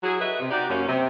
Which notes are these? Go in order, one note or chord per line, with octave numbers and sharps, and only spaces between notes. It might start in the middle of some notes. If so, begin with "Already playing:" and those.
F#3 E4 G#4
F#4 A4 B4 D#5 E5
C3
D#4 F#4 G4 D5
F#2 A#3 C#4
C3